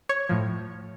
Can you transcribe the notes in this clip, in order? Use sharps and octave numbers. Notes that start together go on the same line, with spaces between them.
C#5
A2 F3